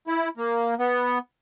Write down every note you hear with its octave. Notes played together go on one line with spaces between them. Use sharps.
E4
A#3
B3